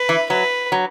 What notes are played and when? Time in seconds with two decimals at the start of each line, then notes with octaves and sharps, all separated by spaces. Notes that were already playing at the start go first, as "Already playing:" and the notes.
Already playing: B4
0.09 E3
0.30 F#3 B4
0.72 F#3